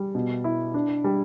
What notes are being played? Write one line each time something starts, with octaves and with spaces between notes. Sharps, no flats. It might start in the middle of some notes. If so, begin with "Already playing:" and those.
Already playing: G3
B2
E4
D4
G3